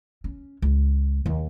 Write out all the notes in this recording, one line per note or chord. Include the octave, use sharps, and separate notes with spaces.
C#4
C#2
D#2